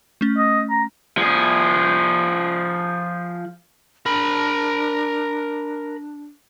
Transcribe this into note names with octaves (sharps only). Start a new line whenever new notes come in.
A3 C#4
D#5
A#5
F3 G#4
D4 A#4 B5